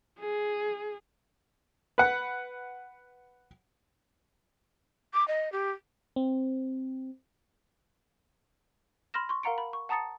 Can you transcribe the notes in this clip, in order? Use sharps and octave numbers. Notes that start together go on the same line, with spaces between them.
G#4
B4 F#5
D6
D#5
G4
C4
B5 C6 F6 A#6 E7
C6 C#6
A#4 F5 F#5 A#5 C#7 D7
B5
C#6
F#5 A5 A#5 D#6 A6 C#7